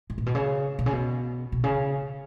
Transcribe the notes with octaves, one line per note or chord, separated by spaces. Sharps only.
G#2
A#2
B2
C#3
B2
C#3
B2
B2
C#3